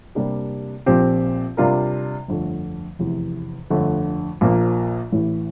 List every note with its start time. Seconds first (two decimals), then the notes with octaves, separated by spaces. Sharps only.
0.15 C3 G3 A#3 D4 G4
0.86 A#1 A#2 F3 C4 G4
1.57 C3 G3 D4 F4 A#4
2.28 G1 F2 D3 A3
2.99 F1 E2 C3 E3
3.70 G1 F2 D3 A3
4.41 A#1 A#2 F3 A#3
5.12 A1 A2 E3